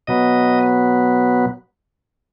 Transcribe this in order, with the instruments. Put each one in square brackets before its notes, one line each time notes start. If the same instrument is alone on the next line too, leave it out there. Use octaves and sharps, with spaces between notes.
[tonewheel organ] B2 F#3 B3 D#5